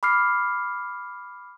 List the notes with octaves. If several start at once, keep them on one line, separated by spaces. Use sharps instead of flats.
B5 D6 F6 C7